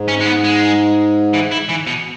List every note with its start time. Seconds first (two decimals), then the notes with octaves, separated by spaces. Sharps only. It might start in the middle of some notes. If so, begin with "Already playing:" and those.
Already playing: G#2
0.08 C#4
0.21 G#3
0.26 B3
0.44 G#3
1.33 E3
1.51 E4
1.69 E3
1.87 B2